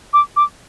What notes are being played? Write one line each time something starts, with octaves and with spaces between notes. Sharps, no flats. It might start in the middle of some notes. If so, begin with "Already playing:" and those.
D6
D6